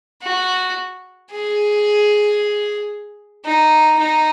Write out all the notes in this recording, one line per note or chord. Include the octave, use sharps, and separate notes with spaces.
F#4
G#4
D#4
D#4